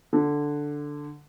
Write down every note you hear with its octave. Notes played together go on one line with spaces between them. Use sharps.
D3